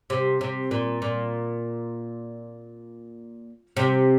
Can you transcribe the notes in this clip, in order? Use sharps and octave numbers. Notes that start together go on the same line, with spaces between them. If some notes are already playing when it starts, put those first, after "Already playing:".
C3
C3
A#2
A#2
C3